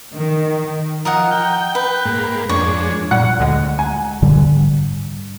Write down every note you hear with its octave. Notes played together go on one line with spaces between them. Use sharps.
D#3
F3 A#4 D#5 F#5
G5
B4
G#2 A#3
F2 G#3 D4 C#5
A#2 G3 F#5
D2 D3 G#3
G#5
G#2 D3 G3